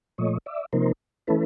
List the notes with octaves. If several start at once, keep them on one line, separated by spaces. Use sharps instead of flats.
A#2 F3 A3 C#5 D#5
D5 E5
C3 F3 A#3 D#4 A#4 C5
E3 A3 C#4 E4 A4 B4